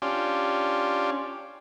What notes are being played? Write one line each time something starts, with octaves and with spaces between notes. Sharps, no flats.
C#4 D4 F4 G4